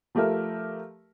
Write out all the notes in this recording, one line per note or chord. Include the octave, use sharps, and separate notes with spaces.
F3 A3 G4 A#4 E5